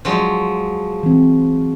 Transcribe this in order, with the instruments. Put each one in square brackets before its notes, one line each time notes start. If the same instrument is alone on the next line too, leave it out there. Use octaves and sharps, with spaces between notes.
[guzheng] F3 F#3 G#3
[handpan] E3 C4